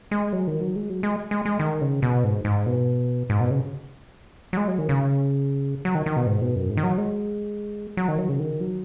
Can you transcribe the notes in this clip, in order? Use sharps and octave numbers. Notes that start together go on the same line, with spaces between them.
G#3
F#3
D#3
F#3
G#3
F#3
G#3
G#3
G#3
D#3
C#3
B2
G#2
G#2
B2
G#2
B2
C#3
F#3
G#3
F#3
D#3
C#3
F#3
D#3
D#3
B2
G#2
B2
F#2
G#2
D#3
F#3
G#3
F#3
D#3
F#3
C#3
D#3
F#3